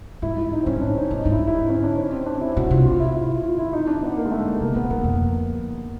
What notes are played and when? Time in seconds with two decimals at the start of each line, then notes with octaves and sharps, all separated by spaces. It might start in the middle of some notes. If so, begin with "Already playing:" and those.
0.22 G#2 E4
0.38 E4
0.52 D#4
0.61 C4
0.66 A2 C#4
0.82 D4
0.96 D#4
1.10 A2 D4
1.21 G#2 D#4
1.32 E4
1.47 E4
1.54 D#4
1.69 C#4
1.84 D4
1.97 C#4
2.12 C4
2.26 D4
2.41 E4
2.56 B2 F#4
2.71 C3 F4
2.86 F4
3.00 E4
3.15 E4
3.29 F4
3.43 F4
3.58 E4
3.73 D#4
3.87 D4
4.02 B3
4.17 A#3
4.25 G#3
4.31 A3
4.60 C3 A#3
4.75 B2 B3
4.90 B2 A#3
5.04 F2